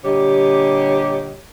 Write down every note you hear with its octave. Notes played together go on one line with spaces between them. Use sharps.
A#2 D3 G3 G4 C#5 D#5